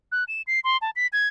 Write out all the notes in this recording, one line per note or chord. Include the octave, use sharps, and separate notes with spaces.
F#6
E7
C7
C6
A5
B6
G#6